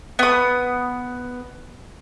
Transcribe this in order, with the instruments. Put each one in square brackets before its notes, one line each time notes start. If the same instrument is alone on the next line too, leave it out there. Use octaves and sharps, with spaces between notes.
[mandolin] B3 D#6